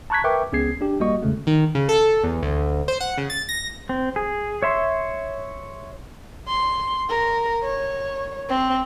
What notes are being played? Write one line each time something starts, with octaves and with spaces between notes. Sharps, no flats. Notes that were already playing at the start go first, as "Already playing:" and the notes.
A5 A#5 C#6 F#6 G#6 B6
A#4 B4 E5 G5 C#6 D6
C#2 B3 C#4 G#4 G#6 C7
D4 G4
G1 G3 A#3 F#4 D#5 C#6
E2 C#3 G#3 A3
D#3
C#3
A4
E2
D2
C5
F#5
C#3
A6
A#6
C4
G#4
C#5 E5 C6
C6
A#4
C#5
C4